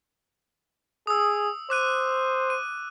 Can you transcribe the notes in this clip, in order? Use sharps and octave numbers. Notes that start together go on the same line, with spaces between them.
G#4 D#6 E6
C5 D6 F#6 D#7
D#7